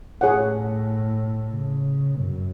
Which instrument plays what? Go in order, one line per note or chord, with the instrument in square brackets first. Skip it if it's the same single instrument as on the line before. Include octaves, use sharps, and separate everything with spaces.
[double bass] A2 [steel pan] G#4 C#5 F#5
[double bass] C#3
F#2